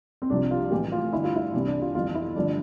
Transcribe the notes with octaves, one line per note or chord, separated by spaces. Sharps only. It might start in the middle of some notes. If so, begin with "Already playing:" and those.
C4
C2 C3 F3 D4
F4
A1 A2 E3 G4
F4
A1 G2 D3 E4
F4
E4
C2 C3 E3 D4
D4
F4
G1 F2 E3 F4
E4
A1 G2 D3 F3 D4